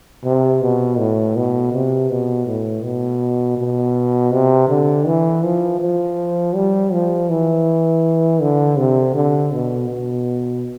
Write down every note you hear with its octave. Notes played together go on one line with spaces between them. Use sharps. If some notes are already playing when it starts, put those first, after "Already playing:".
C3
B2
A2
B2
C3
B2
A2
B2
B2
C3
D3
E3
F3
F3
G3
F3
E3
D3
C3
D3
B2
B2